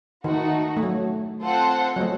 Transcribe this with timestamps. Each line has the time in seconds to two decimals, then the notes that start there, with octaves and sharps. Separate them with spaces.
0.24 D#3 A3 D#4 F#4
0.77 A3
0.83 F#3
1.42 C4 F4 A4 C5 F#5
1.96 F#3
2.01 A3